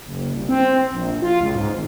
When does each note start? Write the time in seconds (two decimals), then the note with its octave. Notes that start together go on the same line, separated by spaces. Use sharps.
0.06 F#1
0.32 C2
0.49 C4
0.92 A#1
1.22 F4
1.41 C#2
1.55 G#2
1.74 G#1